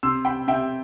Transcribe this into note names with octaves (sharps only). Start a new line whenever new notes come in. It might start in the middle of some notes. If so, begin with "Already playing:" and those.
C3 C6 E6
G5 B5
C3 E5 G5